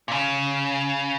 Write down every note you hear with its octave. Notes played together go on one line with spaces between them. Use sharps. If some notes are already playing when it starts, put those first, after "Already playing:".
A#2
C#3